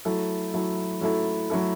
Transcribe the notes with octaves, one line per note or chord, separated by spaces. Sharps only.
F#3 A3 E4 A4
F#3 A3 E4 A4
F#3 A3 E4 A4
F#3 A3 E4 A4